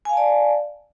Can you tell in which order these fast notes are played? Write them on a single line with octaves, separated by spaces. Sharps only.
G#5 F5 A5 D5